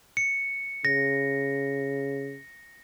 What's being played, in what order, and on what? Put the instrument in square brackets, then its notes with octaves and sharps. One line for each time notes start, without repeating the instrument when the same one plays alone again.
[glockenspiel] C#7
[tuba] C#3 [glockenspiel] A#6